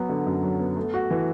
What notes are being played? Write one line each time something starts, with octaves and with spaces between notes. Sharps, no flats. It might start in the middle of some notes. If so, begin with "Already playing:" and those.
Already playing: F#3 B3
D3
F#2
F#3
B3
A3
F#4
E3